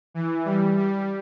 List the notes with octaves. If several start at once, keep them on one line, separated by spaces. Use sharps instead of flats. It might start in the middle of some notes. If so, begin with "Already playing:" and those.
E3
G3
G3